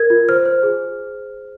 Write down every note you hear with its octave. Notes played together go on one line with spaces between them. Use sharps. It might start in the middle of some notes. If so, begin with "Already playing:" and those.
Already playing: A#4 G#6
F4
C5 F6
C5
G#4